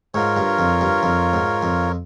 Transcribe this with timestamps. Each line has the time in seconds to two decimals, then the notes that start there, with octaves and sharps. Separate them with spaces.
0.14 G#2 F4 A#4 C#5
0.37 G2
0.59 F2
0.81 G2
1.03 F2
1.33 G#2
1.63 F2